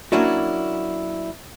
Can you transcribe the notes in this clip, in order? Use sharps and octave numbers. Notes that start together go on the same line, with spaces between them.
F#3 A#3 C#4 D4 E4 F#4